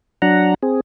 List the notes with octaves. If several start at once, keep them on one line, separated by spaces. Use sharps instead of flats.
F#3 D4 F#5 A#5
C4 G#4